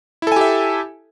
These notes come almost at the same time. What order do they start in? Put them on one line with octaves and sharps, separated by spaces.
E4 A4 G#5 G4 E5